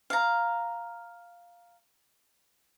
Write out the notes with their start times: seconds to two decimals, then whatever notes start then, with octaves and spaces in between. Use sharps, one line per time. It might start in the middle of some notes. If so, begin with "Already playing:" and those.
0.10 F5 A#5